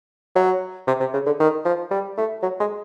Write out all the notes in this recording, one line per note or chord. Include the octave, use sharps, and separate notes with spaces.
F#3
C3
C3
C#3
D3
D#3
F3
G3
A3
F#3
G#3